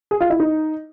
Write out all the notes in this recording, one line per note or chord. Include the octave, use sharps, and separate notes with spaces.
G#4
F4
E4
D#4